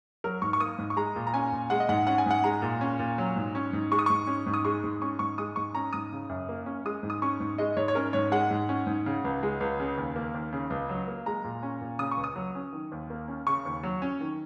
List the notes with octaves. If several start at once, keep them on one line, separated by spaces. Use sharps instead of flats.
F#3 A#4
G#2 C#6
C#6
A#3 D#6
G#2
C#6
G#3 A#5
A#2
A#5
C#4 G#5
A#2
G#3 F#5
D#5
G#2 F#5
C#4 F#5
G#5
G#2 F#5
G#3 A#5
A#2
C#4
A#2
F#3
G#2
C#4
G#2
G#3 C#6
D#6
G#2 C#6
C#4
G#2
D#6
G#3 C#6
G#2
C#4 C#6
G#2 C#6
G#3 D#6
G#2 C#6
C#4 A#5
G#2 D#6
C#3
F#2
A#3
C#4
G#3 D#6
G#2
D#6
C#4 C#6
G#2
G#3 D#5
G#2 C#5
C#5
C#4 A#4
G#2 C#5
G#3 F#5
G#2
C#4
G#2
C#3
C#2
G#3
C#2
C#3
D#2
A#3
D#2
C#3
C#2
F#3
A#3
G#3 A#5
A#2
C#4
A#2
C#3 D#6
C#6
C#2
D#6
F#3
C#4
D#3
D#2
A#3
C#4
C#3 C#6
D#2
F#3
C#4
D#3